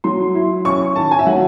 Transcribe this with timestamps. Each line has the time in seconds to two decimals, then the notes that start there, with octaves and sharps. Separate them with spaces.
0.04 F#3 C6
0.35 E4
0.65 C#4 C#6
0.96 D#3 A5
1.11 G#5
1.19 E5
1.26 F#3 F#5